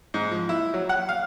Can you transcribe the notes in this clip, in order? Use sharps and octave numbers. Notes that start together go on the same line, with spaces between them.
G#2
F3
E4
F#3
F#5
F5